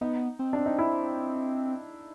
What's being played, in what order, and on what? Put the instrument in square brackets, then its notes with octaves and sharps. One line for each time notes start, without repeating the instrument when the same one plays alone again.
[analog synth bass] B3 [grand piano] D#4
[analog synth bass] C4
[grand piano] D4
D#4
E4